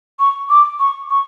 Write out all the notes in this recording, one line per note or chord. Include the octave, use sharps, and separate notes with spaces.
C#6
D6
C#6
C#6